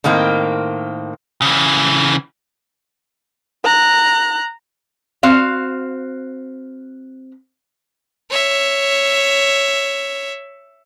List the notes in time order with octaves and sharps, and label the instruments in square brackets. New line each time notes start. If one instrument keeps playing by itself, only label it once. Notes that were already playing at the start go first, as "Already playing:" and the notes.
[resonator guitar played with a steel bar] A2 D#3 A#3 C4
[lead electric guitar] C#3 E3
[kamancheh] A#5 F#6
[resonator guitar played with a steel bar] C4 F#4 F5
[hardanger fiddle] C#5 E5